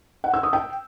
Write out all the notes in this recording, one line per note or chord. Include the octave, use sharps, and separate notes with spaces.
F#5
E6
D#6
G5